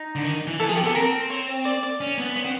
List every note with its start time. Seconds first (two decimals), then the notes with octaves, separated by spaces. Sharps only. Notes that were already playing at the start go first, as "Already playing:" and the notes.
Already playing: D#4
0.15 D3
0.24 D#3
0.47 E3
0.60 E3 A4
0.69 F3 G#4
0.77 G4
0.83 B3 A4
0.95 C4 A#4
1.30 C#5
1.65 D5
1.83 D5
2.01 C#4
2.18 B3
2.35 B3 C#5
2.45 C4